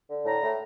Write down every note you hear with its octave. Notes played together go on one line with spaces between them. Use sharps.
D3
A2 A#5
A2